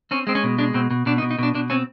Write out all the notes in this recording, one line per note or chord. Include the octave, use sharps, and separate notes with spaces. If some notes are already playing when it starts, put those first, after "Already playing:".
C4 C#4
G#3 C4
C#4
B2
G#3 D4
B2 C4
B2
B2 D4
D#4
B2
D#4
B2 D4
B2 D4
C4 C#4